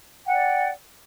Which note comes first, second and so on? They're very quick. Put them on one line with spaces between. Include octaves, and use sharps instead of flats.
G5 F#5 D5